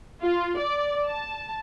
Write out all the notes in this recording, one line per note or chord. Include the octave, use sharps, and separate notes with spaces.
F4
D5
A5